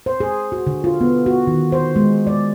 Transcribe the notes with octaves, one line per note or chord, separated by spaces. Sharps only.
C5
G#4
F#4
D3
F4
B3
F#4
D#3
C5
G#3
D5